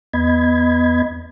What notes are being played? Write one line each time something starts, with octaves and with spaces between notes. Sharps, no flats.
E2 B3 D#5 B5 G#6